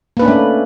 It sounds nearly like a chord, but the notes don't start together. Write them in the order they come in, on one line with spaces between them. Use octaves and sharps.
A#3 B4 D4 C#4 A3